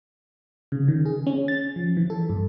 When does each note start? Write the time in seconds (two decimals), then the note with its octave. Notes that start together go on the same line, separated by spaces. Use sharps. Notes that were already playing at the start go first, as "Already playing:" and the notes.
0.72 C#3
0.88 D#3
1.06 G#4
1.27 C#4
1.48 A6
1.76 F3
1.97 E3
2.10 A4
2.30 G2